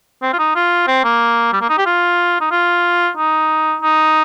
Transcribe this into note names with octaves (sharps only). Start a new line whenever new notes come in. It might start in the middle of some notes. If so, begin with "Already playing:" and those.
C4
F4
D#4
F4
C4
A#3
G3
A#3
D#4
G4
F4
D#4
F4
D#4
D#4